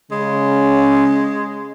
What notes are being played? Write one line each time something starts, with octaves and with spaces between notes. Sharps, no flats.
C#3 G#3